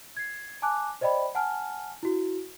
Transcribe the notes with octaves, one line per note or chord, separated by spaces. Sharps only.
G#6 C7
G#5 A5 D6 F#6
C5 D5 D#5 G5 B5
F#5 G#5 A5 F6
E4 F#4